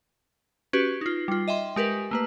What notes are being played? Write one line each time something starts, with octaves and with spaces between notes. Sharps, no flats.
C#4 F#4 G4 B4
D#4 F4
G3 F4
D#5 E5 G5 C6
G#3 G4 A#4 B4
A3 A#3 B4